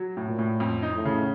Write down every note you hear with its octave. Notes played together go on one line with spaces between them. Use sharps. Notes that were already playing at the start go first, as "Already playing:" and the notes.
Already playing: F#3
A2
A#2
A2
F2
D#4
A2
C#3